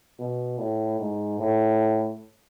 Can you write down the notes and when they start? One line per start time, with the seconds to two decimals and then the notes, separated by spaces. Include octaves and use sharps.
0.19 B2
0.59 A2
0.99 G#2
1.39 A2